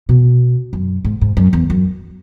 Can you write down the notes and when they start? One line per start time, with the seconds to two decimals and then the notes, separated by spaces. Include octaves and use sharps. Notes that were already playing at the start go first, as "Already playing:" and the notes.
0.09 B2
0.73 F#2
1.05 G#2
1.21 G#2
1.37 F#2
1.53 E2
1.70 F#2